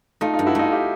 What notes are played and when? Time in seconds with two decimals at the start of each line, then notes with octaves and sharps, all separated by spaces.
0.21 A3 D#4 F4
0.34 D#4 F4
0.39 G2
0.46 E4 F#4
0.55 A3 D#4 F4
0.72 F4 G4